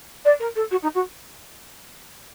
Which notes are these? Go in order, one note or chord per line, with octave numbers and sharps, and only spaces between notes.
D5
A#4
A4
F#4
D#4
F#4